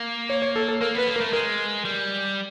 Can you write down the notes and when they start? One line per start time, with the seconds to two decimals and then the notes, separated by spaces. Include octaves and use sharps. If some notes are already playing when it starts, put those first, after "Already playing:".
Already playing: A#3
0.30 C#5
0.42 C#5
0.56 A4
0.68 A4
0.81 A#3 A#4
0.95 B3 B4
1.08 A#3
1.16 A#4
1.21 A3
1.33 G#3 A#4
1.85 G3